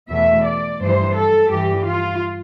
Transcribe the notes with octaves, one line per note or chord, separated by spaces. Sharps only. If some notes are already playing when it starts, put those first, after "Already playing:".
E2 B2 A3 E5
D5
G2 E3 G3 C5
A4
G2 E3 G3 G4
F4